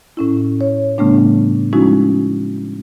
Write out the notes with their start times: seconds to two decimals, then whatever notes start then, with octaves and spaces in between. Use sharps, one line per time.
0.17 A2 C#4 E4
0.61 C#5
0.98 A2 C#3 G3 A3 B3 D4
1.73 F3 G#3 C#4 D#4 E4 F#4